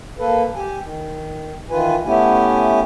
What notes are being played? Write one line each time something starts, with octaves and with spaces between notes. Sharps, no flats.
A#3 A4 B4
G4 G#5
D#3
D#3 E3 F4 B4 G#5
A3 B3 C#4 E4 G4 G#5